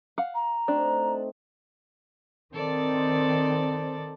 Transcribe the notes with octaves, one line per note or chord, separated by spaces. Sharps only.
F5 F#5
A#5
A3 C4 D4 D#4
D#3 C4 A4 D5